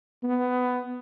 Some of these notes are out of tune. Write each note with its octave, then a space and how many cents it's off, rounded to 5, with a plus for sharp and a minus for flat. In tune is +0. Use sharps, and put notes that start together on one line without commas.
B3 +15